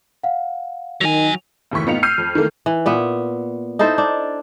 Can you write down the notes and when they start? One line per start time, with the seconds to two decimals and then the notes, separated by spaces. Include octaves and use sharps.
0.23 F5 F#5
1.01 D#3 F#3 G#5 F7
1.71 F#1 D#2 A2 E3 C#6 B6
1.86 A2 B3 D#4 F4 C#7 F7
2.03 E6 F6 G6 C7 D#7
2.18 F2
2.35 D#3 E3 A3 A#3
2.66 E3
2.86 A#2 B3 E5
3.79 D#4 E4 A4 C5
3.98 D4